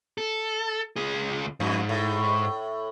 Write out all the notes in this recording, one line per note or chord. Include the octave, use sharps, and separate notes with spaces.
A4
C#2 G#4
F2 G#2
A2